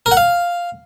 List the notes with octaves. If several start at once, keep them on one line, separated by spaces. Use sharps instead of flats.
A#4
F#5
F5